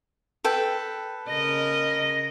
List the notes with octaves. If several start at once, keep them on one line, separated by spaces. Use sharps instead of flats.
A4 B4 G5
C#3 A#4 D#5 A#6